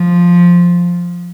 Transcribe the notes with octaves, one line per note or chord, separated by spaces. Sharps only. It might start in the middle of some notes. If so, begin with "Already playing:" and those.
Already playing: F3